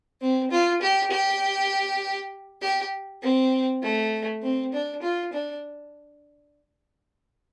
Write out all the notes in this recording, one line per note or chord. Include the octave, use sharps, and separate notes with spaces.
C4
F4
G4
G4
G4
C4
A3
C4
D4
F4
D4